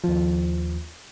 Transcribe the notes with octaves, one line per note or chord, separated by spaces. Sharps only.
D#2 F3